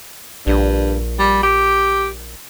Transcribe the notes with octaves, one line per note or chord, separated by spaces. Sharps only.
A#1 G2
G3
G4